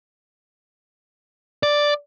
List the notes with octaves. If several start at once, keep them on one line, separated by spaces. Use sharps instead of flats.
D5